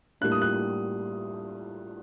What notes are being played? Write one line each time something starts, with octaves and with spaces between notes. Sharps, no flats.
A2 G3 A#3 D4 F#6
D#6
F#6